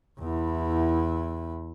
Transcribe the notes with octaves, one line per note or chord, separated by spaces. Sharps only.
E2 E4